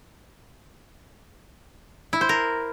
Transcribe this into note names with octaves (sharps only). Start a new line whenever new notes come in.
E4
C5
A#4